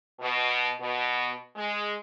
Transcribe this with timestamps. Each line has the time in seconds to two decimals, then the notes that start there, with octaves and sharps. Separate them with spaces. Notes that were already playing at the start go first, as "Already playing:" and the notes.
0.19 B2
0.80 B2
1.56 G#3